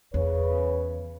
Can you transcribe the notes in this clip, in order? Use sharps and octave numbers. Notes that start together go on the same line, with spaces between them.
E2 C#3 B4 C#5